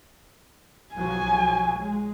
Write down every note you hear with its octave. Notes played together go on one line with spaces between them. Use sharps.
B1 F3 F#3 G#5
G#3